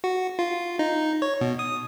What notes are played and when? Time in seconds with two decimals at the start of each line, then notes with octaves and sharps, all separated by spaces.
0.04 F#4
0.39 F4
0.79 D#4
1.22 C#5
1.41 B2
1.59 D#6